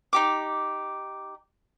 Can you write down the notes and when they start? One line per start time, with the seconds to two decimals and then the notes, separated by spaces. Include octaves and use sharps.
0.13 D#4 G4 D6